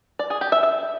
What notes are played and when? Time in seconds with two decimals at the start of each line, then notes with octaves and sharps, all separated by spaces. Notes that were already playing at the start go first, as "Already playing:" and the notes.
0.19 D5
0.30 G#4
0.41 G4
0.52 E5
0.63 E5